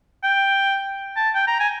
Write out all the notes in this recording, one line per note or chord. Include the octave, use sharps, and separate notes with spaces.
G5
A5
G5
A#5
G#5